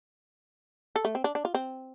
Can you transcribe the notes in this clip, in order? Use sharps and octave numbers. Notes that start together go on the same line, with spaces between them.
A4
A3
C4
D4
D4
F4
C4